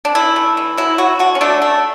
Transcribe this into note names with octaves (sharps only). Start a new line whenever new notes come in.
D4
E3 E4
A3
E3
F#3 E4
F#3 F#4
D3 F#4
C#4
A3 D4
A3